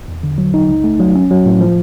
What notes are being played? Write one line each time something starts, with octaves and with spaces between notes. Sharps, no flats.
E2
D3
F#3
D#4
C#2
A3
F#3
C#4
F#3
A2
F3